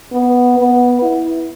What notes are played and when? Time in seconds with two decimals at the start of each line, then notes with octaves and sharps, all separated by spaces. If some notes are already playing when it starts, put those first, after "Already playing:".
0.12 B3
0.58 B3
1.02 E4